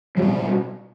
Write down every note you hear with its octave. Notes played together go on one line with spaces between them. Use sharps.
F#3
B2 G3
B2